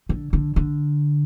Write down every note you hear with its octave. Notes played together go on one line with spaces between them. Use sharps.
D3
D3
D3